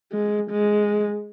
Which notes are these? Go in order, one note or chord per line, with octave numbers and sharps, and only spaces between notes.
G#3
G#3